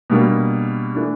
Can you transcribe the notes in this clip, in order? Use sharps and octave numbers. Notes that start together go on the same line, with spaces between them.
B2 G3 A#3 D4
E3 A3 D4